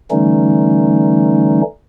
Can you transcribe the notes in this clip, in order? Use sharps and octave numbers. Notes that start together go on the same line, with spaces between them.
D3 E3 G3 A3 C#4 D#4